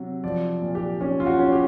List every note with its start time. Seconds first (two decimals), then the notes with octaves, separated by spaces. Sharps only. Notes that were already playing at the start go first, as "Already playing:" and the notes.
Already playing: C3 F#3
0.23 F3 D5
0.62 A#2
0.75 G4
1.00 C#4 G4
1.20 F4
1.26 F#4
1.39 C#4
1.52 G4